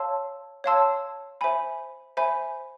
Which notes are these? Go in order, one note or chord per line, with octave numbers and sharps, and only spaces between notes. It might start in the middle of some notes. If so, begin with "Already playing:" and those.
Already playing: C#5 F5 A5 C6 E6
C#5 F5 A5 C6 E6
C5 E5 G#5 B5
C5 E5 G#5 B5